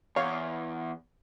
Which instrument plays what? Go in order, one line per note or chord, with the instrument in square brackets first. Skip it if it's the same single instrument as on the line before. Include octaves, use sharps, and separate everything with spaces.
[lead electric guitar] E2 [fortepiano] C#5 F5